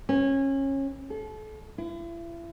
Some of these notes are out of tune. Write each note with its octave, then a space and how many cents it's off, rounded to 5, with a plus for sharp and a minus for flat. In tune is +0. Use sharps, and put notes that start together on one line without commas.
C#4 -25
A4 -35
E4 +40